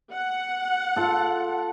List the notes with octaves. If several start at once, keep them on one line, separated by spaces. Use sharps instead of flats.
F#5
F4 A4